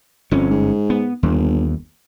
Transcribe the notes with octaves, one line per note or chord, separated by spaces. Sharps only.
G1 F2 C#4
G#2
B3
G1 D#2